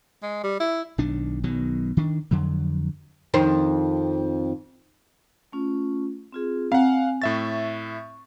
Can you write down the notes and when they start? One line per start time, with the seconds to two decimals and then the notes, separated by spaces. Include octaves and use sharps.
0.23 G#3
0.44 G3
0.60 E4
0.98 B1 D#3 D4
1.44 B1 B2 D#3 F#3
1.97 D#3 D4
2.31 F2 D3 F#3
3.34 F2 D#3 C5
5.52 A3 C#4 F4
6.32 C4 F4 G#4
6.72 C4 F5 F#5 G#5
7.22 A2 E5 C#6 A6